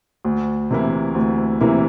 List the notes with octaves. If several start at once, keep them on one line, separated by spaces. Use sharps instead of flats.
D2
C3 E3 A#3 E4
D2
C3 E3 A#3 E4